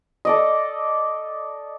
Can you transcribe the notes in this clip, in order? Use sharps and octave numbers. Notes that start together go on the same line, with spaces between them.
A4 D5 D#5